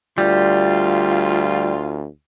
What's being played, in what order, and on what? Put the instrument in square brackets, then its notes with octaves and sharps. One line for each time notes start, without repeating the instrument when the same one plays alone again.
[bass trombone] D2 [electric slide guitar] G3 [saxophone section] F4